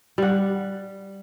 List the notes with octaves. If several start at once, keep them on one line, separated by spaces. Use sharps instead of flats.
G3 F#5